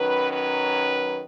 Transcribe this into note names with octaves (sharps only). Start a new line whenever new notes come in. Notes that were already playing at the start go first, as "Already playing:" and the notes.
Already playing: D#3 F#3 C#4 B4
B4